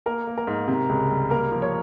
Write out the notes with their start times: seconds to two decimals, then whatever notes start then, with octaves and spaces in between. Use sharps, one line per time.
0.06 A#3 A#4
0.27 A#3
0.38 A#4
0.47 G#2
0.68 C3
0.89 C#2
1.09 G3
1.30 A#3 A#4
1.52 F3
1.62 C#5